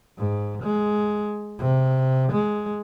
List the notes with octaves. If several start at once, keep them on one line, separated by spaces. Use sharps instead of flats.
G#2
G#3
C3
G#3